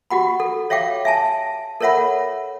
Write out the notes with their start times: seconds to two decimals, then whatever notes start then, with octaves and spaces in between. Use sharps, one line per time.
0.10 F#4 G4 F#5 B5
0.40 A4
0.70 C#5 E5 F5 G5 D6
1.05 E5 G#5 A5
1.81 A4 A#4 C#5 E5 F#5 B5